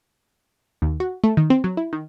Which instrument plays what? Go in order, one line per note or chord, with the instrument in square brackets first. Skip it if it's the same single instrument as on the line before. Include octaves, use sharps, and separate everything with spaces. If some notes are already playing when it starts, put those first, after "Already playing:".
[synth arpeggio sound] D#2
F#4
A3
D#3
C4
F#3
E4
D#3